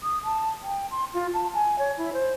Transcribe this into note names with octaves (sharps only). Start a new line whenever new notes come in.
D#6
A5
G5
C6
F4
A5
G#5
C#5
E4
C5